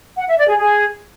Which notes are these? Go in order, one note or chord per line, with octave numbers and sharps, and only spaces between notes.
F#5
E5
D5
G#4
G#4